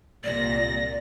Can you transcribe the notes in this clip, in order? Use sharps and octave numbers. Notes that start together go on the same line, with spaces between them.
C2 A#2 D5 A#6